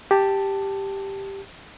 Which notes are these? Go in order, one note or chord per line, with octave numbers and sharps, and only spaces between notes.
G4 A5